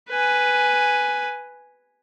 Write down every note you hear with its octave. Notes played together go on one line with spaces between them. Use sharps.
B4 G#5